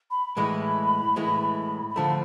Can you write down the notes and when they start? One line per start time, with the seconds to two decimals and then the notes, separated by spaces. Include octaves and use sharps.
0.10 B5
0.37 A2 E3 G#3 B5
1.16 A2 E3 G#3
1.89 B5
1.96 D3 F3 A3 A5